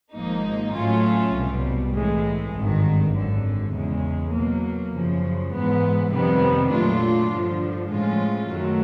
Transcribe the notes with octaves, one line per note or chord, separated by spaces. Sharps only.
G#1 G#2 F3 A#3 D#4
A2 F#3 A3 C#4 F4
C2 B2 G3
A2 E3 G#3
G#1 G2 D#3
G#1 F#2 D3
E2 C#3 E3 G#3
B2 F#3 A#3
F#2 C#3 F3
G#2 E3 G#3 B3
F2 C3 D#3 G3 B3
A#2 F#3 A3 D4 F4
G2 D3 F3
A2 F3 G#3 C#4 F4
F#2 D#3 F#3 A3